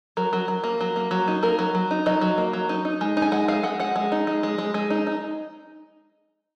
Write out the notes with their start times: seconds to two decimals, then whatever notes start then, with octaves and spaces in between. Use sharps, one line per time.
0.17 F#3 A#4
0.33 F#3
0.48 F#3
0.64 A#3
0.81 F#3
0.96 A#3
1.11 F#3
1.28 D#4
1.43 A#3 A#4
1.59 F#3
1.75 F#3
1.91 D#4
2.06 F#3 D#5
2.21 F#3
2.38 A#3
2.53 F#3
2.69 D#4
2.85 D#4
3.01 G#3
3.17 D#4
3.22 G#5
3.32 G#3 F#5
3.48 G#3 F5
3.63 G#3 F#5
3.80 G#3 F#5
3.96 G#3
4.12 D#4
4.27 G#3
4.43 G#3
4.58 G#3
4.74 G#3
4.90 D#4
5.07 D#4